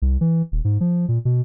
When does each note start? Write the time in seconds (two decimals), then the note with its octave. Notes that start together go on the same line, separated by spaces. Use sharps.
0.02 C2
0.21 E3
0.52 D#1
0.65 G#2
0.81 F3
1.08 A#2
1.25 B2